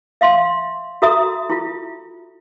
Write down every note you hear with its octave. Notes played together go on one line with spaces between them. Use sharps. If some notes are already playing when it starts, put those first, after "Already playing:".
E5 F5 C6
F#4 A4 E5 A#5 D#6
E4 F4